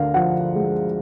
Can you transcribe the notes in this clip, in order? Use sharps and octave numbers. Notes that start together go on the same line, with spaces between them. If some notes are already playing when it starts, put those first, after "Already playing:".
Already playing: D2 D3 A#4 F5
F3 F#5
G#3